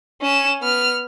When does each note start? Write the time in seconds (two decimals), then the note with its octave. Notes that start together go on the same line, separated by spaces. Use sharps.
0.21 C#4 E7
0.61 B3 F6